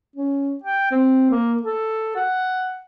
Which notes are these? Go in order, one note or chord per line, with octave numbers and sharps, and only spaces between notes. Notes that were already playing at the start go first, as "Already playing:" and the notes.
C#4
G5
C4
A#3
A4
F#5